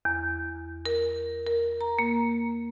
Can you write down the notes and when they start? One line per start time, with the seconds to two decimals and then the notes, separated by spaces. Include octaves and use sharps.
0.05 E2
0.86 A#4
1.47 A#4
1.81 A#5
1.99 A#3